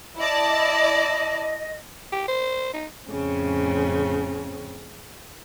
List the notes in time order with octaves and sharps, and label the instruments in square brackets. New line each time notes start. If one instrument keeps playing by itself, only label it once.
[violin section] E4 D5 A5 [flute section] D#5
[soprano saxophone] G4
C5
D#4
[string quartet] F2 A2 C#3 C4 C#4